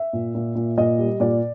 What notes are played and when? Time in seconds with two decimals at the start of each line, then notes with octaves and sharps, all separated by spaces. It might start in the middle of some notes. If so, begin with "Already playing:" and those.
Already playing: E5
0.13 A#2
0.35 A#2
0.55 A#2
0.78 A#2 D#5
0.99 G3
1.20 A#2 D5